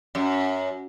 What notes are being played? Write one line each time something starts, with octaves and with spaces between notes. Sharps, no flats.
F#2